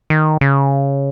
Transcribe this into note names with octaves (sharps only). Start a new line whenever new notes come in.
D#3
C#3